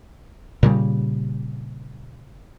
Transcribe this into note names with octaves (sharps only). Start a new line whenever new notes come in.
A#2 C#3 G3